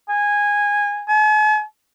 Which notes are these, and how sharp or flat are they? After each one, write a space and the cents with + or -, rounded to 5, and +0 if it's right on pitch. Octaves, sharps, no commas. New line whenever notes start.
G#5 -15
G#5 +45